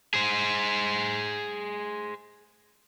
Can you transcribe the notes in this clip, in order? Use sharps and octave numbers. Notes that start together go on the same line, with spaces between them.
G#4 C5